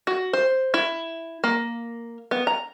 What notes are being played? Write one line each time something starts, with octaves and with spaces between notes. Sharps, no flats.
F#4
C5
E4
A#3
B3
A#5